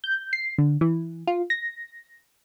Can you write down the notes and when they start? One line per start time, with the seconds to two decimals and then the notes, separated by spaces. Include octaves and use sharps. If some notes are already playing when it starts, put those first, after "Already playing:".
0.04 G6
0.33 C7
0.58 D3
0.81 E3
1.27 F4
1.50 A#6